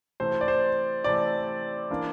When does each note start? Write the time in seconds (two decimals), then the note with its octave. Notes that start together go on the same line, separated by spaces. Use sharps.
0.20 C3 E3 A3 C5
0.41 D5
0.48 C5
1.04 C3 E3 A3 D5
1.91 E3 A#3 D4